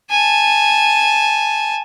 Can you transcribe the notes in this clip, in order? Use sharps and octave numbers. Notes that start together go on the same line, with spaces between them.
G#5 A5